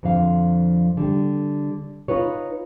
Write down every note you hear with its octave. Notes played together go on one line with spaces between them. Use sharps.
F2 D3 F3 F5
D3 G3
D#4 F4 B4 C#5